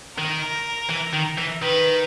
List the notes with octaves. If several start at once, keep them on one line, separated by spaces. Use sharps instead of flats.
D#3 A#4
E3
D#3
E3
D#3 B4